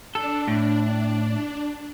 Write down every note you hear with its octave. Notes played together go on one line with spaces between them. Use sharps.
D4 A4
A2